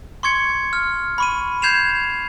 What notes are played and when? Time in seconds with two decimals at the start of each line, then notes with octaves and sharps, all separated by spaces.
0.23 C6 C#6 G#6 C#7
0.73 F6
1.18 B5 C#6 D#7
1.62 G6 G#6 C7 E7 F7